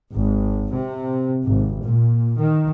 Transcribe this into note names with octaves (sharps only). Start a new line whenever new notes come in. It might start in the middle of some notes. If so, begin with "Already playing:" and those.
G#1
C3
G#1
A#2
D#3